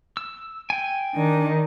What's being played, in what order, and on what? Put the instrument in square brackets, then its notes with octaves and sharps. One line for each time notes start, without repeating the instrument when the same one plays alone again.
[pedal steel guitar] E6
G5 G#5
[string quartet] D#3 [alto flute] D4